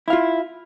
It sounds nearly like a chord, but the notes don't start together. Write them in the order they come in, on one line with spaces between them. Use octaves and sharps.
E4 F5 F4